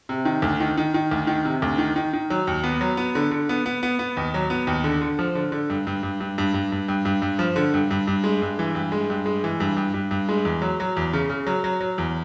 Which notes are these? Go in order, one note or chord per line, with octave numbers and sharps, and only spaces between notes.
C3
D#3
D2
D#3
D#3
D#3
D2
D#3
C3
D2
D#3
D#3
D#3
F#3
D#2
B3
F#3
B3
D3
D3
B3
B3
B3
B3
D#2
F#3
B3
D#2
D3
D3
F3
D3
D3
G2
G2
G2
G2
G2
G2
G2
G2
G2
G2
F3
D3
G2
G2
G2
G#3
G2
E3
G2
G#3
G2
G#3
E3
G2
G2
G2
G2
G#3
E2
F#3
F#3
E2
C#3
C#3
F#3
F#3
F#3
E2